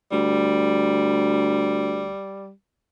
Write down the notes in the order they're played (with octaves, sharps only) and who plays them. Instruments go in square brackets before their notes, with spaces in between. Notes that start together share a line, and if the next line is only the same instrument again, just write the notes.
[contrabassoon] D2 [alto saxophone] G3